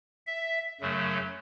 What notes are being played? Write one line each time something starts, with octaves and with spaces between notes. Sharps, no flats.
E5
F#2 C#3 F#3 A3